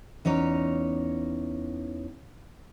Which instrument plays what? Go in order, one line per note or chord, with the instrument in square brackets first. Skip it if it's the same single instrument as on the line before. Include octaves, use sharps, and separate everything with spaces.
[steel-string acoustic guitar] E2 C#4 D#4 C#5